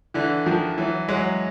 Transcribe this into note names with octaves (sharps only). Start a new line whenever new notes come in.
D3 E3
D#3 F3
E3 F#3
F#3 G#3